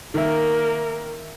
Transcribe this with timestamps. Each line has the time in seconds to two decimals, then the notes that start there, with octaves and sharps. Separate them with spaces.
0.14 D#3 A#3 A#4 E5